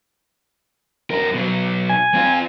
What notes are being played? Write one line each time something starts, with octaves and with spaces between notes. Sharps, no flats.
F2 A#4
B2 F#3
G#5
C4 F4